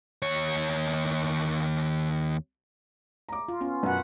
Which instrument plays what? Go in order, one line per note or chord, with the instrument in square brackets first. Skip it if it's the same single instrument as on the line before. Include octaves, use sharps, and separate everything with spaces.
[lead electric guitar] D#2 C#5
[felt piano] A#5 D6
[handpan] F4
B3 C#4 F4
[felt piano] F#2 B2 [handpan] B4 F#5